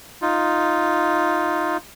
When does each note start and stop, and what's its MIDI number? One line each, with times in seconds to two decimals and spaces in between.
0.22 1.77 63
0.22 1.77 65